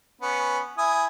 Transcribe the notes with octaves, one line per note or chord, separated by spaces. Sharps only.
B3 C#4
E4 G#5 D#6